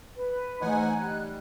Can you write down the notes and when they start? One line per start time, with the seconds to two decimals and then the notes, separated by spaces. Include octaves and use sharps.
0.16 B4
0.62 G#2 E3 A3 D#4 F#5 G#5
0.97 G3 F#6